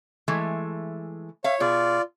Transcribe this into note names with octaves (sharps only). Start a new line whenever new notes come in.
E3 G#3 A3
C#5 E5 F5
B2 F4 G#4 D5